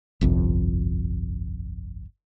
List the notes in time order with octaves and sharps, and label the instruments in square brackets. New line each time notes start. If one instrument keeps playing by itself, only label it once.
[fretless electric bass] G1 C2 F2